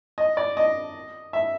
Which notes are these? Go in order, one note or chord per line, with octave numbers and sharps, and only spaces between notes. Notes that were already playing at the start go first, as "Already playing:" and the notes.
D#5
D5
D#5
E5